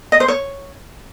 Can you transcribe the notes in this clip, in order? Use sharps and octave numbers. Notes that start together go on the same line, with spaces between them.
D#5
C5
C#5